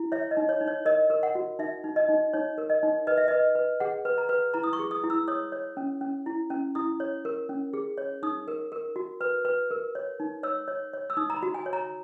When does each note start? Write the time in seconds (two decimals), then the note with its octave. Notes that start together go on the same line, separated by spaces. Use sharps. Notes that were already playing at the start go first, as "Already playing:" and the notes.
Already playing: E4
0.12 C#5 E5
0.31 D#5
0.37 D#4
0.49 C#5
0.61 D#4
0.67 C#5
0.85 A#4 D#5
1.10 A#4
1.23 F#5
1.35 F#4
1.59 D#4 E5
1.84 D#4
1.96 D#5
2.09 D#4
2.33 D#4 C#5
2.58 A#4
2.70 D#5
2.83 D#4
3.07 B4 D#5
3.17 E5
3.28 B4 D#5
3.55 B4
3.80 G#4 F#5
4.05 B4
4.18 A#5
4.29 B4
4.54 E4 A#5
4.64 D#6
4.73 C#6
4.79 G#4
4.91 D#6
5.04 E4
5.10 E6
5.28 C#5 D#6
5.52 C#5
5.77 C#4
6.01 C#4
6.26 E4
6.50 C#4
6.75 E4 D#6
7.00 C#5
7.25 A#4
7.49 C#4
7.73 G#4
7.98 C#5
8.23 D#4 D#6
8.48 A#4
8.72 A#4
8.96 F#4
9.21 B4
9.45 B4
9.71 A#4
9.95 C#5
10.20 D#4
10.43 C#5 E6
10.68 C#5
10.93 C#5
11.10 E6
11.17 D#4 D#6
11.30 A#5
11.36 B5
11.43 F#4
11.54 G#5
11.66 C#5
11.73 A#5